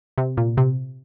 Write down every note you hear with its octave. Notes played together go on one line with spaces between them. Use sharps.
C3
A#2
C3